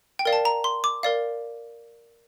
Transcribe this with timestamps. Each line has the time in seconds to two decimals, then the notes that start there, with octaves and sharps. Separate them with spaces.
0.19 G5
0.25 A#4 D5 F5
0.33 A5
0.45 A#5
0.64 C6
0.84 D6
1.03 A#4 D5 F5